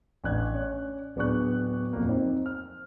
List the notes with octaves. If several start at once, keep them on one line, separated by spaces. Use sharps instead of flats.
A1 D4 F#6 G#6
C#4 C#5 D5
D1 B3 D4 G#4 C#6 F#6
D1 F2 A#3
C4 D#4 C5
F6